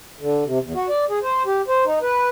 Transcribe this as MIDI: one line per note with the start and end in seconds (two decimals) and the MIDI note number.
0.20 0.44 50
0.45 0.59 48
0.63 0.73 40
0.75 0.87 66
0.89 1.05 74
1.09 1.19 68
1.22 1.43 72
1.46 1.62 67
1.68 1.84 72
1.85 1.99 63
2.02 2.29 71